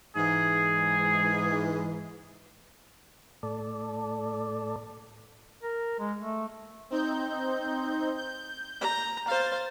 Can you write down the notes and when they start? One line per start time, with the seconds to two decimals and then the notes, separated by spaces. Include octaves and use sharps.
0.16 G#2 E3 G#4
3.43 A2 A4 D5
5.63 A#4
6.00 G#3
6.20 A3
6.90 C4 D#4 G6
8.16 G6
8.81 A#5
9.28 C5 F5 A6